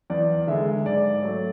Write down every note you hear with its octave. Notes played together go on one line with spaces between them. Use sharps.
E2 D5
D3 G#3 E5
G#2 D5
F#3 A3